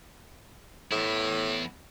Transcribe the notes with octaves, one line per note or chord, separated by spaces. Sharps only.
E2 A2 E4